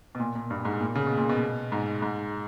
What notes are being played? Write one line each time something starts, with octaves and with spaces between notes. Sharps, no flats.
B2
A#2
A#2
G2
G#2
A#2
C#3
B2
A#2
B2
G#2
G#2